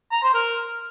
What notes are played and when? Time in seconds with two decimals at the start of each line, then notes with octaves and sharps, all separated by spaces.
0.12 A#5
0.23 C5
0.34 A#4